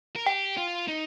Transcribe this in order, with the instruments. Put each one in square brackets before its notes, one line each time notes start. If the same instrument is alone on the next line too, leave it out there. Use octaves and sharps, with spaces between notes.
[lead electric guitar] A#4
[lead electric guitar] G4 [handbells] G5
[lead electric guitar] F4
D#4